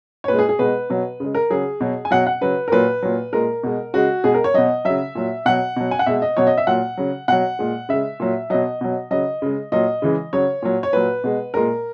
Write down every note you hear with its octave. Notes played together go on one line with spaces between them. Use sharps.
C#5
A#2 G#3 B4
G#4
G#4
B2 G#3 B4
B2 F#3
C#3 G#3
A#4
C#3 F#3 G#4
B2 F#3
G#5
B2 F#3 F#5
F#5
C#3 F#3 B4
A#4
A#2 F#3 B4
A#2 F#3
A#2 G#3 A#4
B2 G#3
C#3 G#3 F#4
B2 G#3 G#4
A#4
C#5
B2 F#3 D#5
C#3 F#3 E5
A#2 F#3
B2 F#3 F#5
B2 F#3
G#5
F#5
B2 G#3 E5
D#5
B2 F#3 C#5
D#5
E5
A#2 F#3 F#5
C#3 F#3
B2 F#3 F#5
A#2 G#3
C#3 G#3 E5
A#2 F#3
B2 F#3 D#5
B2 F#3
C#3 F#3 D#5
C#3 G#3
A#2 F#3 D#5
C#3 E3 G#3
C#3 F#3 C#5
A#2 F#3
C#5
A#2 F#3 B4
B2 G#3
A#2 G#3 A#4